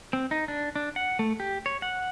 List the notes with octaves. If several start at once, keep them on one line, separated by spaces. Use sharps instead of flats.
C4
D#4
D4
D4
F#5
A3
G4
C#5
F#5